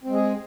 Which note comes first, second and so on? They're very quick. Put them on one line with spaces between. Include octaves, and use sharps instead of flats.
C4 G#3 G#4